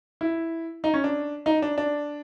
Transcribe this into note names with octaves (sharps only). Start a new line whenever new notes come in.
E4
D#4
C#4
D4
D#4
D4
D4